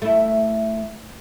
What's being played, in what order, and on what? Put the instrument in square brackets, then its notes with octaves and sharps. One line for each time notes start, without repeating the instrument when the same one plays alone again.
[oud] A3 E4